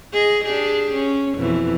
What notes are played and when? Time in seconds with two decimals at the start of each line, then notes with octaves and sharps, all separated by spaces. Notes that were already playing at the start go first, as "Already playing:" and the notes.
0.13 G#4 D#5
0.45 D4 G4 G#4
0.94 C#4
1.37 F2 B2 E3